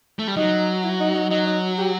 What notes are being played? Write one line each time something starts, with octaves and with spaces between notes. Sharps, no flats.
A3
G3
F#3 D#4
E4
D#4
D#4
F#3 D#4
D#4
G4